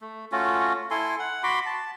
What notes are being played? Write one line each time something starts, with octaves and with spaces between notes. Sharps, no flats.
A3
A3 C#4 F4 F#4
E4 A4 G#5 C6
F#5
F#4 B5 C6 D6
A5